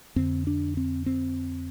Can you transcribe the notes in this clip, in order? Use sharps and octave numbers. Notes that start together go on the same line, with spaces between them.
F2 D3 C4
D4
C4
C4